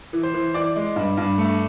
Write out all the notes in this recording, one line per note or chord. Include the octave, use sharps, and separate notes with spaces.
E3
C5
E3
E3 D5
G#3
G2
G2
A3